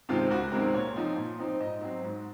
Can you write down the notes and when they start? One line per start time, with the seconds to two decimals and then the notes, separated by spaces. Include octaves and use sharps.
0.09 C3 D#3 G#3 C4 F4
0.30 C#2 F#4
0.52 C3 D#3 G#3 C4 A#4
0.74 A#2 C#5
0.96 F3 C4 D#4
1.16 A#2
1.39 F3 C4 D#4
1.60 G#2 D#5
1.81 F#3 C4
2.03 G#2